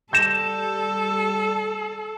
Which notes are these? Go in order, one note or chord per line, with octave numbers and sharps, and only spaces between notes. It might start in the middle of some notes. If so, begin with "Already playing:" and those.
G3 A4 G6 A#6 E7